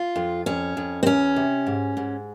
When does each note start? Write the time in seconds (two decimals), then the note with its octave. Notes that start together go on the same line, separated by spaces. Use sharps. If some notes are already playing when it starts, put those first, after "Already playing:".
Already playing: F4
0.16 F2
0.46 F2 C#4
0.77 F2
1.03 C4
1.06 E2 C#4
1.36 C3
1.66 G#2
1.97 G#2